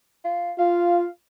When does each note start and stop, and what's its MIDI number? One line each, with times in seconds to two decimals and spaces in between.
0.25 0.52 65
0.59 1.06 65
0.59 1.07 77